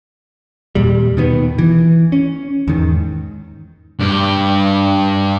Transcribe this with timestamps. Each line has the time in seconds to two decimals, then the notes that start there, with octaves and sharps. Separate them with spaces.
0.75 D#2 A#2 G3
1.17 B2 D#3 B3
1.58 E3
2.12 C#4
2.68 E2 G#2 D#3
3.99 G2 G4